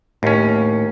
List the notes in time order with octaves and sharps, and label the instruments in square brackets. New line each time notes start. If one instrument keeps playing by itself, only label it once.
[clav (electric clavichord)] D#2 C#4 [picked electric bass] A2